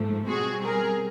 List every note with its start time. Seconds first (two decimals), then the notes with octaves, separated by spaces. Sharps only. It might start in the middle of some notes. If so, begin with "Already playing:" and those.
Already playing: G#2 F3 A3
0.27 B2 G3 C4 F#4 G#4
0.63 G#4 A#4